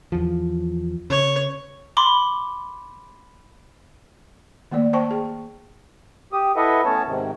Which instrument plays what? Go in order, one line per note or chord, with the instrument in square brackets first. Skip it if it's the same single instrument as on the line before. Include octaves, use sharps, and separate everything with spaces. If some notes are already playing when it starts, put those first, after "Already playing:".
[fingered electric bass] E2 F3
[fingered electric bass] C#3 [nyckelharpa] C#5
[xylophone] B5 C6 D6
[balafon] D#3 A3 A#3 D5
C5 G5 A5 C#6
G#4
[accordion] G4 D#6
E4 A4 B4 D#5 E5 F#5
A3 B3 C#4 C#5 A5
G#2 C3 D#3